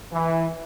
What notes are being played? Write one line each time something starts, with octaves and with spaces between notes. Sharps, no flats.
E3